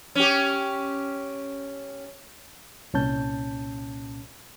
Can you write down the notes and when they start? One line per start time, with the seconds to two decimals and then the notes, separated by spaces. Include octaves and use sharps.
0.15 C#4 G4
2.94 C2 A#2 C#4 A5 G6